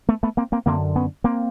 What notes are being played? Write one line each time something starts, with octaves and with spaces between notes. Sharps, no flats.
A3 B3
A3 B3
A#3 C4
A#3 C4
F#2 D3 A#3 C4
B3 C#4
A#3 C4